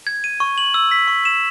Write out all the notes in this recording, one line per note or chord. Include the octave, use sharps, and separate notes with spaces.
G#6
D#7
C#6
F#7
E6
B6
C#6
E7